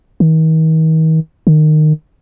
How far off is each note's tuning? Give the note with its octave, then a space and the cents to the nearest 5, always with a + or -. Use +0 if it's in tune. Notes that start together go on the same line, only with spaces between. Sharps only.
D#3 +40
D#3 -20